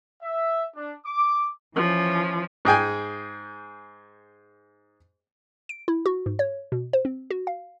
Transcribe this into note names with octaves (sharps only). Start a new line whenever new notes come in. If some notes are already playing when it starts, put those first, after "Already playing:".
E5
D4
D6
E3 F3 C#4
G#2 G#4 G5 G#5
D7
E4
F#4
G#2
C#5
B2
C5
C4
F#4
F5